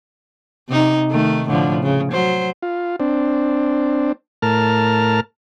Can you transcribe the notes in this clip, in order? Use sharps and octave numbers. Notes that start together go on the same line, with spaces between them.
C3 D#4
D#3 A3
A2 D3 F3
C#3
F#3 C5
F4
C4 D4
A2 A#4 A5 F6